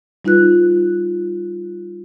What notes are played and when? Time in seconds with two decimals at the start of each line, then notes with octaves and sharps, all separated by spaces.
0.25 G3 D#4 F4 B4 F#6